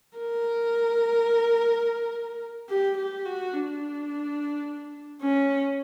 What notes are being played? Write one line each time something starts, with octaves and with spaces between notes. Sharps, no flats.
A#4
G4
G4
F#4
D4
C#4